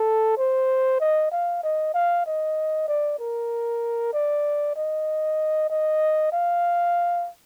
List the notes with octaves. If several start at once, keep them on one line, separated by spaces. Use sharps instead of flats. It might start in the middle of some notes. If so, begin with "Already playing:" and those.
Already playing: A4
C5
D#5
F5
D#5
F5
D#5
D5
A#4
D5
D#5
D#5
F5